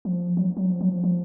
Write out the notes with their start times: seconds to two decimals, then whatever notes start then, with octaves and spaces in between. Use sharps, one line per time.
0.05 F3
0.37 F#3
0.57 F#3
0.70 F3
0.81 F#3
0.91 F3
1.04 F3